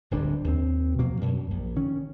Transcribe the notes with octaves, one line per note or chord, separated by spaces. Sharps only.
D1 G1 G2 D4
D#2 C4
B2 F3 F#3 A#3
F#2
A#1
D#3 C#4